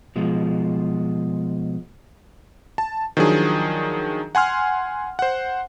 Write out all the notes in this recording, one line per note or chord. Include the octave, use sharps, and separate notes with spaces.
B2 F3 G#3
A5
D#3 F3 F#3 D4 G#4
F#5 G#5 C6 F6
C5 F#5